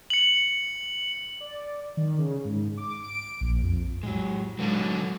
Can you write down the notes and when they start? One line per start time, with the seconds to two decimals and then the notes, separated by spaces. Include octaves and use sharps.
0.10 C#7 F#7
1.40 D5
1.97 D#3
2.18 C#3
2.44 G#2
2.77 D6
3.03 D7
3.41 A#1
3.62 F2
4.03 A2 F#3 G#3
4.59 B2 D3 F#3 G#3